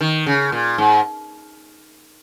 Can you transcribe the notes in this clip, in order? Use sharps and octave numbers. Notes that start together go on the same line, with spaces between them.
D#3
C#3
A#2
G#2